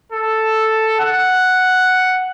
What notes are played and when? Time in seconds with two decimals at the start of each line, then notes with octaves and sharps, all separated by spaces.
0.12 A4
1.00 F#5